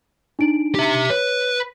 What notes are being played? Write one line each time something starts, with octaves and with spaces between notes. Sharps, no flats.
D4 D#4 D7
G4 E5
B4 C#5